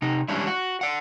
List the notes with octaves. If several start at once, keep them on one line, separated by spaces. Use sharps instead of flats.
C3 D#4
E3 G3 G#3 C#4 D4 E4
F#4
D5 F#5